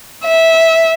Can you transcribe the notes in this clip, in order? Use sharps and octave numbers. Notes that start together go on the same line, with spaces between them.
E5